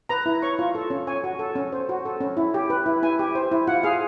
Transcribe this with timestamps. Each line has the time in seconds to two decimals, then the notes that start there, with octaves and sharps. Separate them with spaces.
0.09 B4 A#5
0.26 E4
0.42 C#5 C#6
0.59 F4
0.75 A4
0.90 C#4
1.07 C#5 G#5
1.24 F#4
1.39 A4
1.56 C#4
1.72 C5
1.89 F#4
2.05 A4
2.21 C#4
2.37 E4
2.54 G4
2.70 B4
2.86 E4
3.03 E4 G#5
3.19 G4
3.35 C5
3.52 E4
3.67 F4 F#5
3.83 G#4 F5